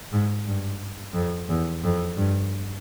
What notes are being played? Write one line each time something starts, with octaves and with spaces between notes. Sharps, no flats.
G#2
G2
F2
E2
F2
G2